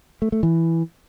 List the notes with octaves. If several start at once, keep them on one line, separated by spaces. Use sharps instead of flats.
A3
A3
E3